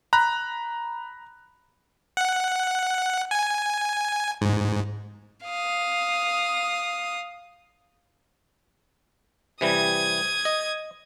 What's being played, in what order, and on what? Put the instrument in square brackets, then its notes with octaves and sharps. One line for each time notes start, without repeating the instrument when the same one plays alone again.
[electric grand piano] A#5 B5 F#6
[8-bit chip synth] F#5
G#5
G#2
[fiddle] F5 D#6
[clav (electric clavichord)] C3 E3 G3 [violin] D#6 G#6
[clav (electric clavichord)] D#5